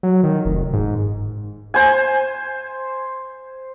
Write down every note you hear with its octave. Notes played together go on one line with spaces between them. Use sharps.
F#3
D#3
F1
G#2
C5 G#5